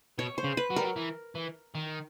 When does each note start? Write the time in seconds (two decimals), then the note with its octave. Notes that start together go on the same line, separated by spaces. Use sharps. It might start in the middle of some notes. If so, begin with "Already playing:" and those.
0.19 B2 C#5
0.38 C5
0.44 C#3
0.57 B4
0.70 F#3
0.76 G3 A#4
0.84 F#3
0.96 E3
1.35 E3
1.75 D#3